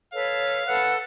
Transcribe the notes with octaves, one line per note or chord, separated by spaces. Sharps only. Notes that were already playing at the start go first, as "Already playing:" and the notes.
A4 B4 C#5 F5
A4 B4 F#5